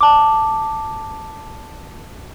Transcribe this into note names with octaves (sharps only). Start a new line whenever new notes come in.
A5 D6